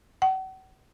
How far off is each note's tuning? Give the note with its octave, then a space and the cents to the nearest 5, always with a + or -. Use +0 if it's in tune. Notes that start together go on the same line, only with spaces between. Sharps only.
F#5 +40